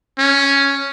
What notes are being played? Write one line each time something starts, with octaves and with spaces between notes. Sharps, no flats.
C#4